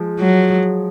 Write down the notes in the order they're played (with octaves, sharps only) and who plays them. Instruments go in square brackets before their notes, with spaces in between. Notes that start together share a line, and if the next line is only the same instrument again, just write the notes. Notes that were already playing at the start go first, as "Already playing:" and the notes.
Already playing: [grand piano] F3 G#3
[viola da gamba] F#3